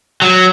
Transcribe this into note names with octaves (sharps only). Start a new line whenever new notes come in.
F#3